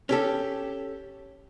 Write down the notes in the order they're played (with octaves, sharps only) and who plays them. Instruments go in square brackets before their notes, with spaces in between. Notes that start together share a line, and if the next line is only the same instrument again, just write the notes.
[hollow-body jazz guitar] C#4 G4 A4